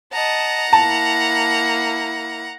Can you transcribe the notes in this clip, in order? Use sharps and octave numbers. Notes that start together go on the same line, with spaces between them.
D#5 F#5 A5 A#5
A#3 E4 A5